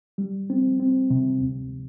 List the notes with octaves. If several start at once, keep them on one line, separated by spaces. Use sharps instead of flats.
G3
C4
C4
C3
D2